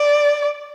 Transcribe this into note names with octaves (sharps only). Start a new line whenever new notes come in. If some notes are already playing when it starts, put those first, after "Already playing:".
Already playing: D5